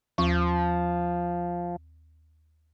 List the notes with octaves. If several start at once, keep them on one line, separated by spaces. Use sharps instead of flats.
D#2 F3 C#6